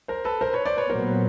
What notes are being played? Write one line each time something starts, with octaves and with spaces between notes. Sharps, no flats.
A#4 C5
A4 B4
A#4 C5
B4 C#5
C5 D5
B4 C#5
A#2 F#3 B3 A#4 C5